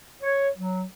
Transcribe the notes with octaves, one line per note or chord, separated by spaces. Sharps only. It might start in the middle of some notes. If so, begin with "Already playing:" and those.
C#5
F#3